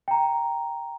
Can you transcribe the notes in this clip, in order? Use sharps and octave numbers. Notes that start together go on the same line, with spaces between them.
G5 A#5